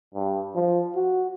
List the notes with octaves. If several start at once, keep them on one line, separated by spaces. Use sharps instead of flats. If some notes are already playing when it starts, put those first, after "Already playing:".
G2
F3
F#4